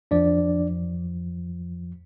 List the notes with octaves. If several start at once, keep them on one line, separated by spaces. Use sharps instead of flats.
F2 F3 D4 D5